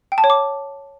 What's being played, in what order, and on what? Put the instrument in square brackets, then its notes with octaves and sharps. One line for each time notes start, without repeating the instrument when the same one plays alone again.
[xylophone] G5
A5
C#5
D6